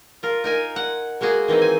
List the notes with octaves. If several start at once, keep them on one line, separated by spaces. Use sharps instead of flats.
F4 A#4
D#4 A#4 G#5
F#5
G#3 A#3 F#4 G#4
D#3 E3 C4 D#4
G#5